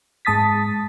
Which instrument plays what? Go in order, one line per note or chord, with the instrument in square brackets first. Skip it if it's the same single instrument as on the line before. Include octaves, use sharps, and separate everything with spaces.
[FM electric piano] G#2 G#3 A5 D#6 A6 B6